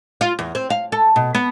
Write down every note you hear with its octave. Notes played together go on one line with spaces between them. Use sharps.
F4
E2
C4
F5
A4
B2
B3